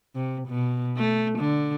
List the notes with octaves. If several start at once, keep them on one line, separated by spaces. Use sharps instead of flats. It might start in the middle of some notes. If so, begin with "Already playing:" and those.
C3
B2
A3
D3